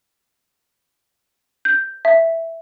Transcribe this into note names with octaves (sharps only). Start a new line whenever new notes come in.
G6
E5